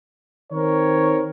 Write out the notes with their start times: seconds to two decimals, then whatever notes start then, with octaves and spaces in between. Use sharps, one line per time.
0.52 D#3 C4 A#4 C#5